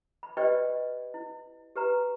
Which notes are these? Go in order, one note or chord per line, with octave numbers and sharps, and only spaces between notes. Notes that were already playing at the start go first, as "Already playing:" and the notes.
B5
G4 B4 C5 D5 D#5 G5
E4
G4 B4 A#5